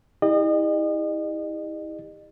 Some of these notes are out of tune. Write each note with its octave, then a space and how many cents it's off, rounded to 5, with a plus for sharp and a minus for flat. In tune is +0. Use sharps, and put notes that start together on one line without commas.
E4 -40 G4 +35 D#5 -40